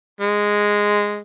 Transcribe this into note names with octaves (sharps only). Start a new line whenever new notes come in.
G#3